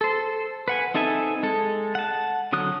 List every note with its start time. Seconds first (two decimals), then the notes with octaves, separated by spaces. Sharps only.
0.01 A4 C5
0.68 B4 F#5 G#5
0.94 C4 D#4 A4 E5 G#5
1.43 G#3 A4
1.95 F#5 A5
2.53 D3 F#3 D#6 F#6